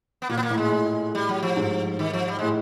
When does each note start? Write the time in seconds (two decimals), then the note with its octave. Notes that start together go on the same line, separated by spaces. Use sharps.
0.22 B3
0.29 A#2 A#3
0.37 B3
0.43 A#3
0.50 A2
0.57 G#3
0.72 A2
1.15 G3
1.29 F#3
1.42 F3
1.57 G#2
1.99 D#3
2.13 F3
2.28 G3
2.39 A2 G#3